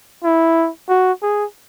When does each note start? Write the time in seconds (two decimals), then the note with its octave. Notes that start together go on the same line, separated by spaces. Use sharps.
0.24 E4
0.89 F#4
1.22 G#4